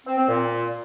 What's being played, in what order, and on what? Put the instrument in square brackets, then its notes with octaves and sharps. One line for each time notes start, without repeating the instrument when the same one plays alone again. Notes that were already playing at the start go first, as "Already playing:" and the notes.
[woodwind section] C4
C4
A#2